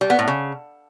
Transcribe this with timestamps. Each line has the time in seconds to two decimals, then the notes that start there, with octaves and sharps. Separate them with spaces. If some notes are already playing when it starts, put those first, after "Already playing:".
0.01 G3
0.10 B3
0.19 A2
0.28 C#3